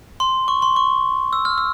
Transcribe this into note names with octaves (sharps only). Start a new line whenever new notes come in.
C6
C#6
C6
C#6
E6
F6
E6